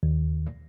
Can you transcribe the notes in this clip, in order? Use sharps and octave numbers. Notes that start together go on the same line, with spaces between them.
D#2